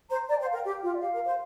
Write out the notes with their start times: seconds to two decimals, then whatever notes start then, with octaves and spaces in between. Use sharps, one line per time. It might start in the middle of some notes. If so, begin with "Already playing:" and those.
0.10 C5 A#5
0.28 D5 A#5
0.38 C5 G5
0.46 F5
0.53 A#4 G5
0.65 G4
0.83 F4
0.94 D5
1.01 G4 F5
1.14 A#4
1.26 C5